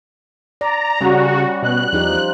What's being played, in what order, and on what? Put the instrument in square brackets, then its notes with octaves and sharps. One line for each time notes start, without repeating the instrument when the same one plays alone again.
[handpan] D5 [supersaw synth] A#5
[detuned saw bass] C#3 [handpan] G3 C#4 [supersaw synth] F#4
[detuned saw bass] B2 [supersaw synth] F#6
[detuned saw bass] E2 [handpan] F3 D#4 G4